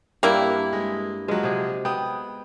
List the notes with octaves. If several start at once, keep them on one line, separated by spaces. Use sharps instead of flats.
G2 A#3 D4 E4 G5
G#3
F3 F#3 G#3
C3 G#4
B3 G5 D#6